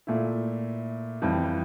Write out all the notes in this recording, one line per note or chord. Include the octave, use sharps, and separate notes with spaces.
A#2 A3 E4
F2 E3 G3